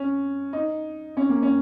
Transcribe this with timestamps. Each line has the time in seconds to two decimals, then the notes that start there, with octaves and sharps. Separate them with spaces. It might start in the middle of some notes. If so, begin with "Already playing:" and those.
Already playing: C#4
0.53 D#4
1.17 C#4
1.29 A#3
1.42 C#4